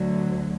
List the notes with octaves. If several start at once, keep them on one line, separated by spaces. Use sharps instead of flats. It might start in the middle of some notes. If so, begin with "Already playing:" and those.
Already playing: D2 D3 F#3